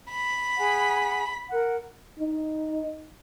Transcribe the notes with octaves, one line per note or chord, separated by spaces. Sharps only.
B5
G#4 F#5 G#5
A#4 F#5
D#4